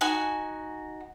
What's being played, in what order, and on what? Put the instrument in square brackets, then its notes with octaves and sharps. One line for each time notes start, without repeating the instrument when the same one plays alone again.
[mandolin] D#4 F#4 G#5